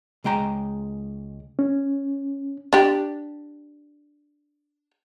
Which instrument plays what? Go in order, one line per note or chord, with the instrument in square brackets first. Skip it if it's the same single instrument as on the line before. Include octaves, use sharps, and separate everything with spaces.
[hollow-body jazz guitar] C#2 G#3 G5 A#5
[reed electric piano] C#4
[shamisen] D4 G4